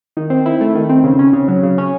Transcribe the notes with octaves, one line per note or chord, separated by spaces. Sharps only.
D#3
C4
E4
A3
D#3
C4
C#3
C#4
C#3
F#3
C#3
C#4